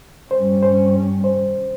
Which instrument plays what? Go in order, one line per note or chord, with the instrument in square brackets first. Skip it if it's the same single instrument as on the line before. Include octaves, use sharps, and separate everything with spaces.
[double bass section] G2 G3 C#4 [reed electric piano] C5
[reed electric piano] C5
C5